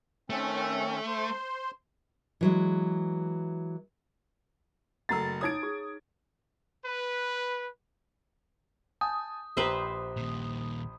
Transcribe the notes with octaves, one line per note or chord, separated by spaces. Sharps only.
D#3 A3 C4 C#4
C5 C6
E3 F#3 G#3
F#1 A3 F#5 A#5 E6 A6
D#4 C#5 D6 D#6 G#6 D7
G#4
B4
G#5 A5 D#6
A#1 G4 B4 C5 E5 A#5
D#2 A#2